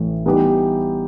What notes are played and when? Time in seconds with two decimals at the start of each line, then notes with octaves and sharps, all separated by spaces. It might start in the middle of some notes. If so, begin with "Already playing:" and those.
Already playing: A1 A2 E3
0.26 E3 G3 B3 D#4 G4